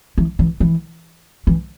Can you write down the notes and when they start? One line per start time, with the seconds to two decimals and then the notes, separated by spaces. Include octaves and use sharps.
0.18 E3
0.39 E3
0.60 E3
1.47 E3